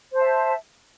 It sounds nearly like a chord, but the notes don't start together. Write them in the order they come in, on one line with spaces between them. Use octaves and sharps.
C5 A5 E5